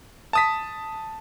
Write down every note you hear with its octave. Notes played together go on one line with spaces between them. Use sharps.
A5 D#6 B6